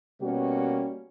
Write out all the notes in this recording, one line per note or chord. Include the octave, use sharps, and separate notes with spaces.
B2 G3 A#3 C#4 F#4